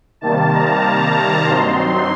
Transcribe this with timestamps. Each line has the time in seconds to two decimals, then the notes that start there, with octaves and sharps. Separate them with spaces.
0.21 C3 D#3 G3 A#3 A5
0.53 A#5
1.45 G2 F#3 C4 D#4 C6